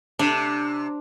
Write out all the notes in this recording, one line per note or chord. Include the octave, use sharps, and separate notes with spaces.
C3 D4